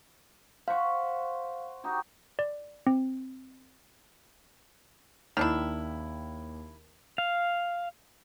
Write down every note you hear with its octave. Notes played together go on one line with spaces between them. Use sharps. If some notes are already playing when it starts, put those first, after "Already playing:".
C5 F5 F#5 C#6
D#4 F#4 G4
D5
C4
D#2 D#3 D4 E4
F5